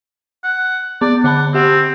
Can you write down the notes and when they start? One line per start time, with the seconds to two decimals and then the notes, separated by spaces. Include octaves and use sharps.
0.44 F#5
1.02 B3 D5
1.24 D3 F#5 A5 B5
1.54 C4 G4 F#5